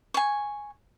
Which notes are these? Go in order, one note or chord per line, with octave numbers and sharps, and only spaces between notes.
G#5 C#6